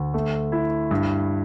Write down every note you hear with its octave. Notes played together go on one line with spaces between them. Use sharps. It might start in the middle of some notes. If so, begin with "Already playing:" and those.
Already playing: D2
A3
E4
G2